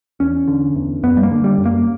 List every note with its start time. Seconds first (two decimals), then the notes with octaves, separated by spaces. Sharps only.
0.20 E2 C#4
0.48 D3
0.76 E2
1.03 F#2 B3
1.17 G3
1.23 A#3
1.31 D3
1.44 G3
1.58 F#2
1.66 A#3